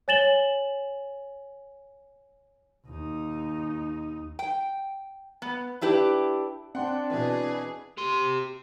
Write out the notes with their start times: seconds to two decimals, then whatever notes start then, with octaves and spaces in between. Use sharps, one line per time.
0.08 C#5 G#5 A6 E7 F#7 G7
2.86 D#2 D#4
4.39 G5
5.42 B3
5.81 D4 E4 G4 B4
6.75 C4 D4 F#5 G5 C6
7.10 B2 E3 G#4 B4
7.97 G4 C6